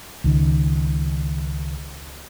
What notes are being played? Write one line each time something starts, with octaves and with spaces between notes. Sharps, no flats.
C#2 D#3